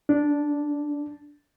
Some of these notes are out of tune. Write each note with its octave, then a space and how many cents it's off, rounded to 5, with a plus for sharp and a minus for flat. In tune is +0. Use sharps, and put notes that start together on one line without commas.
D4 -5